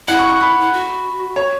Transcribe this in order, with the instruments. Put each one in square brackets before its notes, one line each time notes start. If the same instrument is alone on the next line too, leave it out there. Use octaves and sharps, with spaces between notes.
[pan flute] E4 [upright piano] F#5
[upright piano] C#6
C#6
B5
[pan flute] E4
F#4
[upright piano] C#5